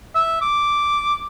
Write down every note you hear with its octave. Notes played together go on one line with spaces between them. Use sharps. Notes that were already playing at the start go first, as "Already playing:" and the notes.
E5
D6